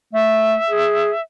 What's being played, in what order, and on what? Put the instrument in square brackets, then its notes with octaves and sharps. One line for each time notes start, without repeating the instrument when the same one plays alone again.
[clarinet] A3 [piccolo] E5
[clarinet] G#4